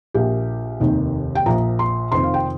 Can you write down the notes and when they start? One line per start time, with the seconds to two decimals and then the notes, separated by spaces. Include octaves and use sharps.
0.14 A#1 A#2 A#3 G4
0.80 F1 D#2 D#3
1.35 G5
1.46 A#1 A#2 F3 A#5
1.79 C6
2.12 F1 F2 D#3 C4 C6
2.23 F5
2.34 G5